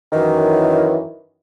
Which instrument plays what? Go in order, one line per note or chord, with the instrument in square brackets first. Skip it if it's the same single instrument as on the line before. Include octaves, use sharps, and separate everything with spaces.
[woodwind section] F#2 D#3 E3